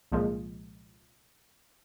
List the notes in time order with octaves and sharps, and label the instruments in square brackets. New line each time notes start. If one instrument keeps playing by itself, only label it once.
[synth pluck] C2 A#2 F3 G#3